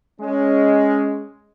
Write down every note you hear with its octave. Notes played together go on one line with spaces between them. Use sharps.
G#3 C#4